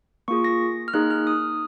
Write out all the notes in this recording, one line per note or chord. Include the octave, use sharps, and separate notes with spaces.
A#3 F4 G#4 C#6
A#6
F6
A#3 D#4 G#4 F#6
F6
D#6